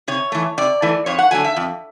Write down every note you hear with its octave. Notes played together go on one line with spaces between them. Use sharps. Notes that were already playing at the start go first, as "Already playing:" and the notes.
C3 C#5
E3 A3
C3 D5
E3 A3
F2 C#5
F#5
D3 F#3 A3 G#5
E5
F2